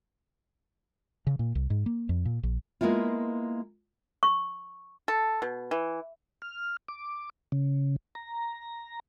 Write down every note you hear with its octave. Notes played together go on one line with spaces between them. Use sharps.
C#3
A#2
C2
G#2
A#3
F2
A#2
A#1
G#3 A#3 B3 E4 F4
C#6
A4
B2
E3
F6
D6
C#3
A#5